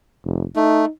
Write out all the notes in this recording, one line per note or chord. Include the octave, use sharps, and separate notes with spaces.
F1
A3 D#4